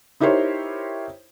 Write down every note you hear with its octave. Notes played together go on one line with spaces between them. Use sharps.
D#4 E4 G4 A#4 C5 C#5